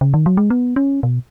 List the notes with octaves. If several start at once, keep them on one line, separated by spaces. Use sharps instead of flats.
C#3
D#3
F#3
G#3
B3
C#4
B2